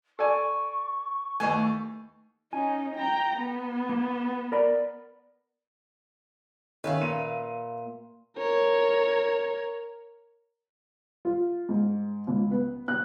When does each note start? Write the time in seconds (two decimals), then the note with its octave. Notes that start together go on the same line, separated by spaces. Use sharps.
0.19 A4 D5 G#5 C#6
1.40 D#2 A3 B3 E4 G#5
2.53 C#4 D#4 G#5
2.96 G5 A#5
3.36 B3
3.89 A#3
4.52 A#4 D5 B5
6.84 D#3 C#4 B4 E5 F5
7.02 A#2 D#7
8.38 A#4 C#5
11.25 F4
11.69 G#2
12.27 C#2
12.51 B3
12.88 F#6